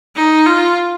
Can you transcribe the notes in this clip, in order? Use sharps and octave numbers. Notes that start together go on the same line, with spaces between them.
D#4
F4